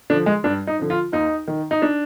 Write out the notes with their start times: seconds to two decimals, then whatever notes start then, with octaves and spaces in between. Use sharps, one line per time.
0.10 D3 F3 D4
0.26 G#3
0.44 G2 D4
0.67 D#4
0.79 D3 F3
0.90 F4
1.12 D#2 D#4
1.47 D#3
1.71 D#4
1.82 D4